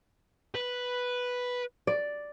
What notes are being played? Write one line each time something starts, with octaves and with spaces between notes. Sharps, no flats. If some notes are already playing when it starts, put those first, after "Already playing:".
B4
D5